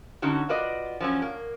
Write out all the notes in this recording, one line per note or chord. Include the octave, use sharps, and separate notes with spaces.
D3 C#4 D#4 F#4
F4 F#4 B4 D5 D#5
F3 F#3 C#4
A#3